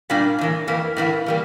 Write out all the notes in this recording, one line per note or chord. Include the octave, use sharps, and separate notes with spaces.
A#2 G3 A#3 D4 F4
A2 E3 A#3
F2 E3 A#3 E4
A2 E3 A#3 E4
E3 G3 A#3